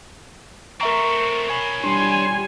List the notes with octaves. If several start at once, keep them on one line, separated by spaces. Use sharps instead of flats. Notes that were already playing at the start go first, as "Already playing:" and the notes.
A3 C4 A#4 E5 A#5 C#6
C#5 G#5 B5
G3 D4 G#5 C6